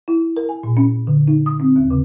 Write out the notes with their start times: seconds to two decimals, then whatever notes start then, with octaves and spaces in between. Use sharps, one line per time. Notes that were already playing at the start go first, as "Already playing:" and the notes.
0.08 E4
0.37 A#4
0.49 G#5
0.63 A#2
0.77 C#4
1.07 D3
1.28 D#4
1.46 D#6
1.60 C4
1.76 D#2
1.91 C#3